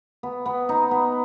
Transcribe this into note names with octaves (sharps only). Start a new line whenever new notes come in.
B3
B3
D#4
B3